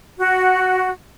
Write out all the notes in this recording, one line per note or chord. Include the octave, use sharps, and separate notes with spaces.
F#4